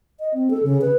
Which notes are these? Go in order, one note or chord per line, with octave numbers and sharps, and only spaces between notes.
D#5
C4
A4
C#3
B4